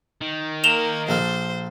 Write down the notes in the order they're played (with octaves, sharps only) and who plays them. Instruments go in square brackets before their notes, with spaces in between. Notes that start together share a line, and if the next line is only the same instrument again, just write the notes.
[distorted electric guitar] D#3
[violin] A#3 [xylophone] E7 F7 G7
[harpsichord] A#1 A4 F5 [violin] C5